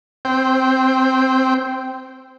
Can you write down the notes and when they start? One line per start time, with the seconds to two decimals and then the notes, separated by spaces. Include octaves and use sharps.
0.25 C4 G5